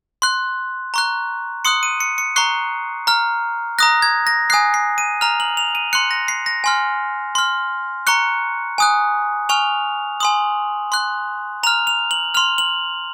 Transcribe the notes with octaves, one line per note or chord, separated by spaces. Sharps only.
C6 F#6
A#5 C#6 F#6
C6 D#6 F#6 C#7
D#7
C#7
C#7
A#5 C#6 F#6 C7
A#5 F6
A#5 D#6 F#6 A#6
G#6
A#6
G#5 D#6 F#6 C7
C7
D#7
A#5 F6 F7
F#7
F7
D#7
C6 F#6 C#7
A#6
C7
A#6
G#5 C6 F6
C6 F6
A#5 C#6 F#6 C#7
G#5 D#6 F#6
G#5 C#6 F6 F7
G#5 C6 D#6 F#7
C6 F#6
A#5 F6 F7
F7
F#7
C6 F6 F7
F#7